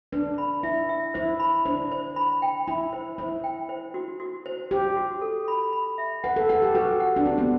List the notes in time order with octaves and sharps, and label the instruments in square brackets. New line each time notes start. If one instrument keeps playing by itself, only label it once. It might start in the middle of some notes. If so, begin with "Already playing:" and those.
[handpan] D4 [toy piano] B4
[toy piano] B5
[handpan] E4 [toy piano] E5
[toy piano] E5
[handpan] E4 [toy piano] C5
[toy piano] B5
[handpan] D4 [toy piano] C5
[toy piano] C5
B5
G5
[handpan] E4 [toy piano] B5
[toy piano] C5
[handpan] E4 [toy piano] C5
[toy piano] G5
C5
F#4
F#4
C5
[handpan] G4 [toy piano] C5
[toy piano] F#4
A4
B5
B5
E5
[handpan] B4 [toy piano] F#5
[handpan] A4
[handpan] A4 [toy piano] F#5
[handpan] G4
[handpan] F#4 [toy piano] B4
[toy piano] F#5
[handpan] D4
[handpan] C4 [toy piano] G4
[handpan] B3